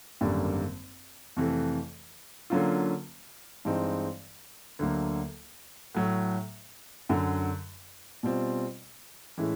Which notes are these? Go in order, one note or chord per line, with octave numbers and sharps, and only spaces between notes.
G#1 F#2 D3 G3 A#3
F2 C3 E3 A3
D3 F#3 A#3 C#4 F4
G2 E3 G#3 C4 D#4
D2 D3 F#3 A#3
A2 F#3 A3
F#2 D3 F#3
B2 G3 C4 F4
A2 E3 G#3 C#4 E4